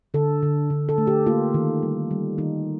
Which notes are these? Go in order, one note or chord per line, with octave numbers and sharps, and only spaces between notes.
D3 A4
D3
D3
A4
A3
G4
A#3 F4
D#3
G3
G3
D#3 D#4